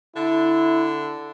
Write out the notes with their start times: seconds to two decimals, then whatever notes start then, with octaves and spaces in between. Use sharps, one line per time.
0.16 D3 E4